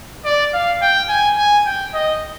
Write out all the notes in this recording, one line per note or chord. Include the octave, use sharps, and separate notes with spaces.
D5
F5
G5
G#5
G#5
G5
D#5